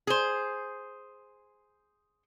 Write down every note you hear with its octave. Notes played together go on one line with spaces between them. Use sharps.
G#4 C5